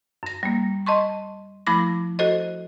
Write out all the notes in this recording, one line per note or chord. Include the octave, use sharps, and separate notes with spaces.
F#2 A#6
G3 A#3
D#5 A5 C6 C#6
F3 A3 E4 B5 D6 A#6
F#4 A4 C5 D#5